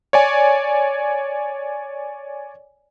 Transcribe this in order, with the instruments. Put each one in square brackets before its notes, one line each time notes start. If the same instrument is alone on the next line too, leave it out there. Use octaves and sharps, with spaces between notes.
[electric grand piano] C#5 D5 G#5